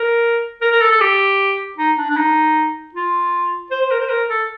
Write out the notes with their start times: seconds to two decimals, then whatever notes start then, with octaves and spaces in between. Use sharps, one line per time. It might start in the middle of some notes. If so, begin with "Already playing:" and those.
Already playing: A#4
0.62 A#4
0.72 A#4
0.81 A4
0.92 A4
1.01 G4
1.78 D#4
1.98 D4
2.10 D4
2.17 D#4
2.95 F4
3.71 C5
3.81 C5
3.91 A#4
4.00 C5
4.09 A#4
4.30 A4